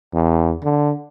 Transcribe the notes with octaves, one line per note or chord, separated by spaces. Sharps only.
E2
D3